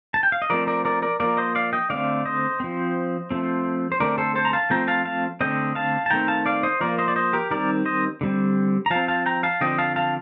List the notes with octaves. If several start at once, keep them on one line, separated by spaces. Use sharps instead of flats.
A5
G5
F5
D#5
F3 A3 C4 A#4 D5
A#4 D5
A#4 D5
A#4 D5
F3 A#3 A#4 D5
C5 D#5
D5 F5
D#5 G5
D3 A3 C4 D5 F5
C5 D#5
F3 C4
F3 A3 C4
C5
D3 A3 C4 A#4 D5
A4 C5
A4 C5
A#5
F5 A5
F3 A3 C4 G5 A#5
F5 A5
F5 A5
D3 A3 C4 D#5 G5
F5 A5
A5
D#3 A3 C4 G5 A#5
F5 A5
D5 F5
C5 D#5
F3 A#3 A#4 D5
C5 D#5
D5
C5 D#5
G4 A#4
D#3 G3 C4 A#4 D5
C5 D#5
D3 G3 C4
A#5
F3 C4 F5 A5
F5 A5
G5 A#5
F5 A5
D3 F3 C4 D#5 G5
F5 A5
F5 A5